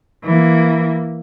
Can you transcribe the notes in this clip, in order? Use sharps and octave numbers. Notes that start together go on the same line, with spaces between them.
E3 A#3